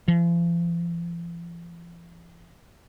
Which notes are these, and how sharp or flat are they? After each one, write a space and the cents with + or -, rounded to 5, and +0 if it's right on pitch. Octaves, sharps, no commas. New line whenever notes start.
F3 -45